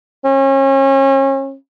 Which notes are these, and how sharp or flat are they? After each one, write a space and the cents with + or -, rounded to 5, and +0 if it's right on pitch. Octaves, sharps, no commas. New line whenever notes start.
C#4 -35